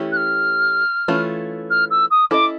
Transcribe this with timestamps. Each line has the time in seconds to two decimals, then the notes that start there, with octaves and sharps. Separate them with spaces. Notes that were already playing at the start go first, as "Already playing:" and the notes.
Already playing: E3 A3 C#4 E4 G4
0.12 F#6
0.16 F6
1.08 E3 A3 C#4 F4
1.70 F6
1.90 E6
2.10 D#6
2.30 C#4 E4 A4 C5 D#5 D6